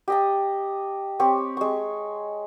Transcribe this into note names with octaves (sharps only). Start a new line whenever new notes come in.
G4 D#5 A5
C4 G4 C#5
G#3 C#6